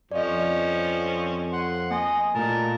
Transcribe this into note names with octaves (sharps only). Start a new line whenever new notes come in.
F2 F3 C4 C#4 D5 D#5
F#5 C6
A#3 D#5 G#5
A#2 A3 F4 A#4 A5